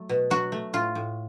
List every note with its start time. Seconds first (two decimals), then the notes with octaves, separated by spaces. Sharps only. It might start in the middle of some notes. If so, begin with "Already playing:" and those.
Already playing: F#3 A3
0.09 B2
0.30 F#3 F#4
0.52 A3
0.73 A2 F4
0.95 A2